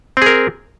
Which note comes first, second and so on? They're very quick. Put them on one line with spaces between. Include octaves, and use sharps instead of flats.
C4 G#4 A#4